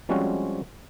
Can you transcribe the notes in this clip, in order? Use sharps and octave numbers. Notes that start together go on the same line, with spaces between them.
F3 G3 G#3 C4 C#4 F#4